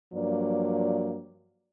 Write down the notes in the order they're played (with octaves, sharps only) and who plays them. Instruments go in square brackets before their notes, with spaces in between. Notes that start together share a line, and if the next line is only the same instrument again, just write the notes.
[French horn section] G2 F3 F#3 A#3 D5